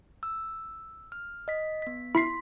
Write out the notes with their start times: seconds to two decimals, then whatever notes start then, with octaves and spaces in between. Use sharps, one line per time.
0.23 E6
1.12 F6
1.48 D#5 B6
1.82 B3 B6
2.15 E4 C6 B6 C7